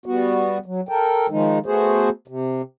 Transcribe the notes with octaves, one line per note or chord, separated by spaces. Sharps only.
G3 B3 F#4
F#3
A4 A#4 G5
D#3 F3 G#3 D#4
A3 B3 F#4 G#4 C5
C3